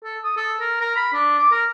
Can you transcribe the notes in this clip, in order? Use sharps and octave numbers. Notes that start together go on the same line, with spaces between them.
A4
D#6
A4
A#4
A#4
B5
D4
D6
A#4